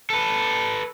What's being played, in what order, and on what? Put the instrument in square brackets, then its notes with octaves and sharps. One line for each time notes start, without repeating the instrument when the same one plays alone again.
[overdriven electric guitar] A4 B4